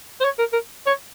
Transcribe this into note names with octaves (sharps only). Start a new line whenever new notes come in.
C5
C#5
A#4
A#4
C#5